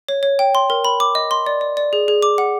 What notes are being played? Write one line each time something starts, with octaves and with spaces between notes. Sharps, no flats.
C#5
C#5
G5
C6
A#4
B5
D6
D#5
C6
D5
D5
D5
G#4
G#4
D6
F#5